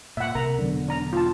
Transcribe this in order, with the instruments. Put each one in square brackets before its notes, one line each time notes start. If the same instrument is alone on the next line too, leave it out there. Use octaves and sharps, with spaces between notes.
[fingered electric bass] A#2 [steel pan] E5 F#5
[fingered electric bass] C2 C3 [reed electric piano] A#4 [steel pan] A#5
[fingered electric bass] E1 F#3 B3 [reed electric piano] D3
[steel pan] D4 A#5
F4 A5